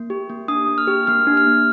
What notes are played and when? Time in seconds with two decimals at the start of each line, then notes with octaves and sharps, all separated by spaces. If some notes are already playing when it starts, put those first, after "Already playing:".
Already playing: A#3
0.10 G4
0.30 A#3
0.48 D4 D#6
0.68 A#3
0.78 F6
0.87 G4
1.07 A#3 F6
1.27 D4
1.37 F6
1.47 A#3